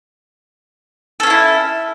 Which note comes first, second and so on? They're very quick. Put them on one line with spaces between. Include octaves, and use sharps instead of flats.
A4 C#4 F4 E4